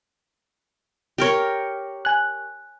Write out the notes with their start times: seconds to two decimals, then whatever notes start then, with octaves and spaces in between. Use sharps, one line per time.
1.18 G4 A#4 C#5
2.05 G#5 F#6